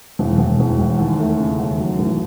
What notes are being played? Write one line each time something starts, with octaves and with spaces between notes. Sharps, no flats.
E1
E1
E1
E2
D#2
A3
C#3
D#2
F#3
A1